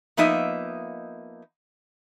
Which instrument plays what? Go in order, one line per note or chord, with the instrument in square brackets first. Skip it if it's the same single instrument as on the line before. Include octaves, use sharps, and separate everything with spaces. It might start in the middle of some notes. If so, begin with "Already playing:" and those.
[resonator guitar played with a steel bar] F3 A#3 B3 D#4 D#5 E5